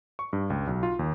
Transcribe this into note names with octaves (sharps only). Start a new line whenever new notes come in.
C#6
G2
C#2
B1
F4
D#2